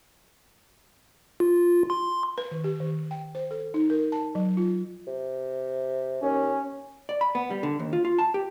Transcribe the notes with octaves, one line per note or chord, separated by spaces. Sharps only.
F4
C6
B4
D#3
G4
D#3
G5
C5
A4
D#4
A#4
A5
F#3
F4
C3
D#2 C#4
D5
B5
B3
G3
D3
D#2
F4
F4
A5
G4